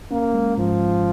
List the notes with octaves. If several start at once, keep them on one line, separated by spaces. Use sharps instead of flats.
A#3 C#4
G#3
G#2 F3
G#1